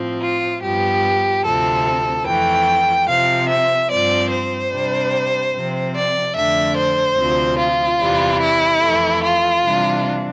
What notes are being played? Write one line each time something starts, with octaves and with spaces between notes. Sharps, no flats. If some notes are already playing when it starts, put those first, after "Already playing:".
Already playing: A2 F3 C4
F4
G2 F3 B3 G4
D2 C3 F3 C4 A4
F2 E3 A3 G5
C3 F3 C4 F5
E5
G2 F3 C4 D5
C5
C3 G3 D4
C3 F3 C4
D5
F2 D3 A3 D4 E5
C5
D2 C3 F3 C4
F4
E2 C3 E3 G3
E4
F2 E3 A3
F4
C3 E3 G3 D4